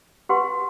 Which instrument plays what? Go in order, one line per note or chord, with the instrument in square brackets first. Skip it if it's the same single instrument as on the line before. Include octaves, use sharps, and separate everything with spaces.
[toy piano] G4 B4 F#5 C6